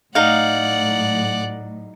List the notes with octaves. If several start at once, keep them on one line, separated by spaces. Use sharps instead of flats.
A2 F#3 D#4 D5 F5 F#5